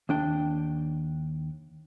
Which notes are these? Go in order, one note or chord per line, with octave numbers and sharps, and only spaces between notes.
D#2 D4 G5